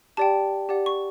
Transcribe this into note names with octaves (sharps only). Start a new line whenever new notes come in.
G4 D5 G5 A5
G4 D5 F#5
C#6